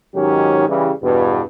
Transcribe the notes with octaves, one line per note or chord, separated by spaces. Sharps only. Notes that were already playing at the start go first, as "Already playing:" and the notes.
G#2 D#3 F#3 C#4 D#4 G4
C#3 E3 G3
E2 G2 B2